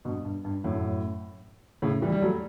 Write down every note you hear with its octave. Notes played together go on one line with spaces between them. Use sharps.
G2 B2
G2
G2
F#2 A2
A2 C#3
E3 G3
G3
F#3 A3